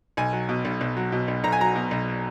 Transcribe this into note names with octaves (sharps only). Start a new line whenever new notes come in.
B1 G#5
F#3
B2
B1
B1
F#3
B2
B1
B1 A#5
G#5
F#3 A#5
B2
B1